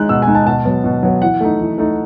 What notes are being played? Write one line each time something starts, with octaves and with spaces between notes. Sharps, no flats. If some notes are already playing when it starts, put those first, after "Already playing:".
Already playing: G#3 D#4 F#6
B2 E6
G#5
G#3 D#4
A5
B2 A5
F#3 B3
B2
F#3 B3
E3 F#5
A3 D#4
E3
A3 D#4